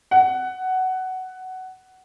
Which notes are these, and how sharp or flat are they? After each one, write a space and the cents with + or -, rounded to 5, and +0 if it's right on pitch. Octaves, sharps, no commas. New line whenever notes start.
F#5 +10